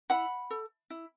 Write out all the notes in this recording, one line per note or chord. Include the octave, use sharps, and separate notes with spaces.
E4 F#5 B5
A4
E4